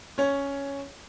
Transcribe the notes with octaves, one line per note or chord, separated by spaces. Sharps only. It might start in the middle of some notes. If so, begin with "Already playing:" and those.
C#4 C#5